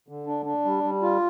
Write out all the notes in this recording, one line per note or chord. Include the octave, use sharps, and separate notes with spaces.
D3
D4
D4
G3
G3
F4